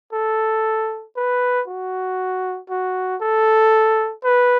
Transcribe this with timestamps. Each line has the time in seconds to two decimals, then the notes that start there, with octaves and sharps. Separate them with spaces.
0.13 A4
1.16 B4
1.68 F#4
2.70 F#4
3.21 A4
4.24 B4